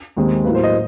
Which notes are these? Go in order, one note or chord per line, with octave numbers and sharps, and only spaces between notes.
D#2 D#3 G#3 C4
A2 F#3 A#3 B4
C5
D#5